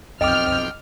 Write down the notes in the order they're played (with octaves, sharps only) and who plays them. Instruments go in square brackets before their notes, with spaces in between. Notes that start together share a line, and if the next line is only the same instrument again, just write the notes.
[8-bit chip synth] B1 F2 G5 [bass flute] C4 [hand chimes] D#5 D6 [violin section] F6